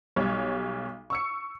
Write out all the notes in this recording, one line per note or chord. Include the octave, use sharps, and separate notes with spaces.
B1 G3 C#5
C#6 E6 C#7